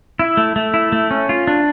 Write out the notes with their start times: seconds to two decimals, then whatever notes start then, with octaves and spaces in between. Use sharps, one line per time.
0.19 E4
0.37 A3
0.56 A3
0.74 E4
0.92 A3
1.11 C#4
1.29 F4
1.47 D4